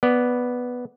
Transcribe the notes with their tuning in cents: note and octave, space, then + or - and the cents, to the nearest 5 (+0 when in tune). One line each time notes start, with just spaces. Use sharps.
B3 +0 D5 +0